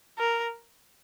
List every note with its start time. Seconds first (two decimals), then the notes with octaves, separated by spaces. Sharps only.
0.18 A#4